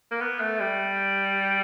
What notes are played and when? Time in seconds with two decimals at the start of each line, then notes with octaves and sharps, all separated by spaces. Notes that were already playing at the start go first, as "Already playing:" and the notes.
0.11 A#3
0.21 B3
0.41 A3
0.60 G3